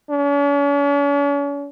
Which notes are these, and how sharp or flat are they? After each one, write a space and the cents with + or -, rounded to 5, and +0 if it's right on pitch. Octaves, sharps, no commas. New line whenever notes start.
C#4 +45